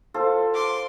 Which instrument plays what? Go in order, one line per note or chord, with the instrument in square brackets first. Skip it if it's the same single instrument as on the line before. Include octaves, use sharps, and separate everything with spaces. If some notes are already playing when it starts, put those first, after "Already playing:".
[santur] F4 A4 C5
[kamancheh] C6 D6